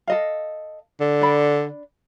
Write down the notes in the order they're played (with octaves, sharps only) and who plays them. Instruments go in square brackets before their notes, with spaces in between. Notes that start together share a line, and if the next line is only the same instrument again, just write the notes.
[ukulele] A4 D#5 F5
[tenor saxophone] D3
[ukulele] D4 D5 B5